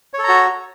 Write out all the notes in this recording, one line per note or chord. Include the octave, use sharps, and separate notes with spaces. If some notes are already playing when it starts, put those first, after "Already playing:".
F#4 A4 C#5 A#5